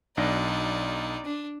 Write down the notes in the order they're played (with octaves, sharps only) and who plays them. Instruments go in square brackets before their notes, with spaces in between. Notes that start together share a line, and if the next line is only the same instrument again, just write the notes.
[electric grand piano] B1 D4 A#6 [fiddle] D#4 D5
[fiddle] D4